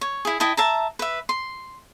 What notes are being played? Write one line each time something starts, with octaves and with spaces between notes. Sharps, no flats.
C#5
E4 G#4
E4 D#5 G5 A5
E5 A5 A#5
B4 E5
C6